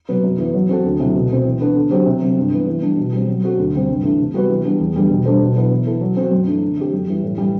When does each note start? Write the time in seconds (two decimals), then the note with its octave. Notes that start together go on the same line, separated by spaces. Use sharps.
0.09 C3 F#3 B3
0.24 F#2
0.39 E3 B3
0.54 F#3
0.69 C4 F#4 A4
0.85 D2
1.00 C3 F#3 A3 E4
1.15 B2
1.30 A3 C4
1.45 E3
1.60 B3 D4 A4
1.76 D3
1.91 F#3 C4 G4 C5
2.06 C3
2.22 F#3 C4
2.37 G2
2.52 E3 B3
2.67 E3
2.82 G3 D4
2.97 B2
3.12 G3 C4
3.28 F#3
3.43 C4 F#4 A4
3.58 D2
3.74 C3 G3 C4
3.89 G2
4.03 E3 A3 D4
4.19 C3
4.34 G3 B3 F#4 B4
4.50 E3
4.65 G3 B3 D4
4.80 E2
4.95 D3 G3 B3
5.10 B2
5.25 G3 D4 A4 C5
5.41 B2
5.56 F#3 B3 E4 B4
5.71 E3
5.86 B3 E4 A4
6.01 F#3
6.17 C4 F#4
6.32 F#2
6.47 E3 A3 D4
6.62 D3
6.77 A3 C4 G4
6.93 F#2
7.08 E3 G3
7.23 A2
7.38 E3 G3